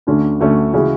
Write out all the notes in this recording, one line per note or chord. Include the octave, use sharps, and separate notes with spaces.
D2 D3 A3 C#4
D2 D3 A3 C#4
C#3 E3 G#3 C#4 F#4